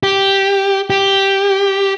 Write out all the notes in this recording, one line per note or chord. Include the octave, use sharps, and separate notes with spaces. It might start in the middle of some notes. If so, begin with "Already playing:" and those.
G4
G4